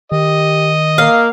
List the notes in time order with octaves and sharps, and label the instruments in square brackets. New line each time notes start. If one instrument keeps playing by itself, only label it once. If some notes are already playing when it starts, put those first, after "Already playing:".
[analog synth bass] D#3 [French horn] G4 [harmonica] D#5
[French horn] A#3 [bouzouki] F5